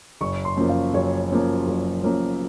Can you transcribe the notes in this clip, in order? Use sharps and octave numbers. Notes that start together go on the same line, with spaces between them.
F#1 C#6
C6
F#2 F3 A#3
F5
F#1 C#5
F#2 F3 A#3
F#1
F#2 F3 A#3